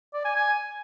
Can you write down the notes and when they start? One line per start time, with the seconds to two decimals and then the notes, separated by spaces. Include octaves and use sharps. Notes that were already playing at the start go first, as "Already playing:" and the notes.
0.14 D5
0.25 G#5
0.36 G#5